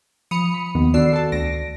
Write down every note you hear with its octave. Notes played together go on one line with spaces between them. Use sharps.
F3 B5 D#6 C#7 F7
B5
D#2 D#3 B3
D3 F#4 D5 E6 C7
A4 A5
D2 A#6 D7